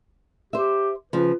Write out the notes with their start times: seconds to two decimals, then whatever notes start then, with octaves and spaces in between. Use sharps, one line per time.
0.53 G4 C5 E5
1.13 C#3 F3 B4